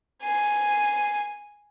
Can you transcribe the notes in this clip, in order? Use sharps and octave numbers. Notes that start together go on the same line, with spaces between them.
G#5 C7